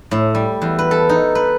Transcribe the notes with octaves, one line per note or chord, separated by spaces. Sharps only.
A2
G3
E2
B4
A4
D#4
B4